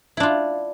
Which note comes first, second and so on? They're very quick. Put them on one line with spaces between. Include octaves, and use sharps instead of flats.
E4 D4 F4